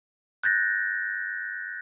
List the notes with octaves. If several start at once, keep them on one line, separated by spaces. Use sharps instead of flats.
F#6 G6 A6 A#6